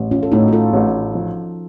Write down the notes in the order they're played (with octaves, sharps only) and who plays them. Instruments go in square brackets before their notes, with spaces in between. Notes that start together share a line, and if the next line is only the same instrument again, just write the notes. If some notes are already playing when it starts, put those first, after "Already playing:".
Already playing: [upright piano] A1
[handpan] C#4 F4
A4
[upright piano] A2 [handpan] D#4 F#4
[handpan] F#4
F4 A4
[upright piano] A1
F3